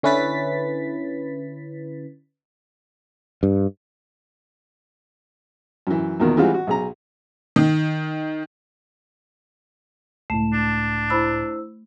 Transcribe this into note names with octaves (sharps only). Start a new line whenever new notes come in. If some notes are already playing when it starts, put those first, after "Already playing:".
D3 C#4 E4 B4 A6 B6
G2
F#2 E3
E2 B2 D#3 F3 A#3
E3 G3 G#3 C4 F4 F#4
F#4
B1 G#4 A#5
D#3
C#2 A2 A3 E7
D4
E4 C5 B5 E6